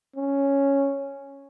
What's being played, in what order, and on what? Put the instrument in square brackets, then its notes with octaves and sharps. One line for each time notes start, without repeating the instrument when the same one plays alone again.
[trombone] C#4